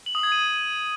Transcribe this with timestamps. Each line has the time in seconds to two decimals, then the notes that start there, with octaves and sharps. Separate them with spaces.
0.06 F#7
0.15 D#6
0.23 G#6
0.32 D#7